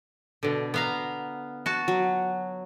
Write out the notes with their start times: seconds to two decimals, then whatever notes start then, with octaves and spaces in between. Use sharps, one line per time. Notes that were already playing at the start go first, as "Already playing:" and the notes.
0.43 B2 D3
0.74 B3 F5 A#5
1.66 F#4 A5
1.88 F#3